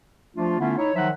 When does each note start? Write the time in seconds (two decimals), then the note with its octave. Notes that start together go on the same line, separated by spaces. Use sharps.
0.35 F3 A3 D4 F4
0.59 D3 A3 B3 C#4 E4 F4
0.77 D#4 E4 C#5
0.94 D#3 F3 F#3 D#4 E5 F#5